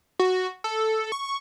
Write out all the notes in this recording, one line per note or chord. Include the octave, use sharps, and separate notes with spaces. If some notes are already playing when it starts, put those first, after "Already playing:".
F#4
A4
C#6